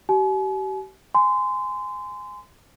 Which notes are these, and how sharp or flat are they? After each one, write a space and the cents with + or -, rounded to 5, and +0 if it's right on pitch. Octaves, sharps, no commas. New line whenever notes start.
G4 -40 G#5 +40
G#5 +0 C6 -25